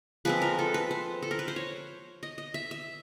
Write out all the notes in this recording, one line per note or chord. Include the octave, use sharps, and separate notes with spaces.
F3 G#3 C4 B4
A#4
A4
B4
C5
A4
A#4
B4
C5
C#5
D#5
D#5
E5
E5